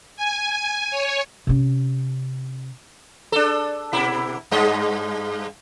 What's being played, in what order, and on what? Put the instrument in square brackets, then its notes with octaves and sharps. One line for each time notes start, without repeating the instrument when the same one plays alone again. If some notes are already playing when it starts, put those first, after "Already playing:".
[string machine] G#5
C#5
[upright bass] C3 C#4
[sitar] D4 A4
B2 E4
G2 G#3 D#5